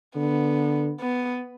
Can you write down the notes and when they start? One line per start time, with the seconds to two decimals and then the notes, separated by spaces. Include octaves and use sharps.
0.16 D3 B3
1.01 B3